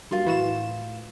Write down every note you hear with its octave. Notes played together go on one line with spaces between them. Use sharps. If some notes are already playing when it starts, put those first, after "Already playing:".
G2 F#3 A#3 F4 C6
A2 E3 F#4 E7